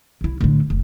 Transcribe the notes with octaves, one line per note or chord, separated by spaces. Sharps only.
C2 E4
A2 D3
F1